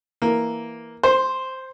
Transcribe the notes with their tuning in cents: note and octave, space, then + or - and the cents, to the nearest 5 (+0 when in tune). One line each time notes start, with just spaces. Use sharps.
E3 +0 A#3 +0
C5 +0 C6 +30